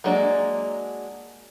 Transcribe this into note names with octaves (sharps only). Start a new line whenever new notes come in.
F#3 G#3 A#3 D4